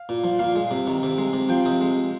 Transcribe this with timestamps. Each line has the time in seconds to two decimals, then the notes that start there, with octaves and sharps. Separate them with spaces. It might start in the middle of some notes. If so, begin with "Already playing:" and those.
Already playing: F5
0.09 A#2
0.24 F3
0.39 A#2 F5
0.56 G#3
0.71 C3
0.87 D#3
1.03 C3
1.18 G#3
1.33 C3
1.49 F3 G5
1.65 C3 D#5
1.81 G#3